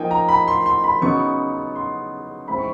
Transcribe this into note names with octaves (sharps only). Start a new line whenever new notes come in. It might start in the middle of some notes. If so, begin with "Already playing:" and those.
Already playing: F3 A#3 D#4 G5 G#5
A#5
B5
C6
C6
B5
C#3 F#3 B3 D#4 C#6
C6
E3 G#3 C4 D#4 B5
C#6